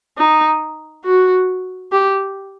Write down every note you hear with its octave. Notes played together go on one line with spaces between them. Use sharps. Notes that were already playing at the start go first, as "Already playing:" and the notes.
D#4
F#4
G4